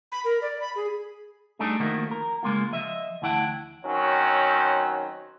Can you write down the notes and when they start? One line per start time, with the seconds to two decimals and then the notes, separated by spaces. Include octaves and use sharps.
0.12 B5
0.25 A#4
0.42 D5
0.61 B5
0.76 G#4
1.59 G3 A3 D4 D#4 G#4
1.80 D#3 F3 A3 A#3 F#4
2.11 A#4
2.43 C#3 G#3 A#3 F4
2.72 F3 D#5 E5
3.22 D2 E3 E4 F#5 G5 A5
3.85 D#3 F#3 C4 C#4